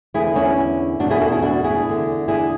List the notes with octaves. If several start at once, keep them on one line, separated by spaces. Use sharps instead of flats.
E2 D3 E4 G#4
C#4 E4
E2 B2 D4 F#4
E4 G#4
F#4 A4
E4 G#4
D4 F#4
E4 G#4
E2 D3
E4 G#4